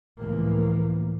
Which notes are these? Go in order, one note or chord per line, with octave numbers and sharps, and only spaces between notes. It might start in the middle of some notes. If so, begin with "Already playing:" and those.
C#2 A2 E3 F3 A#3